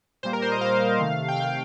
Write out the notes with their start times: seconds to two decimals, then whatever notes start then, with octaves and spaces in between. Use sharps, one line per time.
0.23 A#2 G3 A#3 C5
0.33 A#4
0.42 C5
0.52 D#5
0.61 A#2 G3 A#3 F5
0.99 C3 D#3 A3
1.28 G5
1.36 C3 D#3 A3 F5